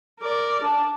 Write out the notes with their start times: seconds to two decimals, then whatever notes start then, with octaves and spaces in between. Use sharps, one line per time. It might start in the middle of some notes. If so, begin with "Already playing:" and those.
0.20 A#4 D5
0.63 D4 A5